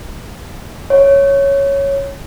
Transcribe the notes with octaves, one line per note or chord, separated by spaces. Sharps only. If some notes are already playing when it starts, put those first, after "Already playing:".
C#5